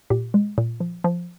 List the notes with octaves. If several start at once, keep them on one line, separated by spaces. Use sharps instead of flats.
A#2 G4
G#3
A#2
F3
F3